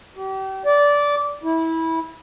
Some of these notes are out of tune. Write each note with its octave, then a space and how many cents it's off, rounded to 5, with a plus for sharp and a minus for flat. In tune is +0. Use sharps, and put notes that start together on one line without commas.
G4 -35
D5 -15
E4 -20